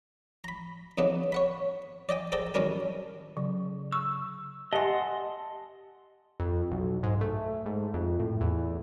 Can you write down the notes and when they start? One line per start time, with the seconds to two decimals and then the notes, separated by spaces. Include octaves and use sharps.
0.44 A#5 B5
0.98 F2 C#3 B3 D4 D#4
1.32 C#5 F#5 B5
2.09 D5 D#5 G5 G#5
2.32 G#4 A4 C5 D5 G5 A#5
2.54 F#2 D#3 G3 D4 A#4 G#5
3.37 C#3 F#3
3.92 C#6 E6
4.73 G4 D#5 F#5 G#5 A5 C6
6.40 F2
6.72 B1
7.03 G#2
7.21 A3
7.65 G#2
7.94 F2
8.20 A2
8.41 E2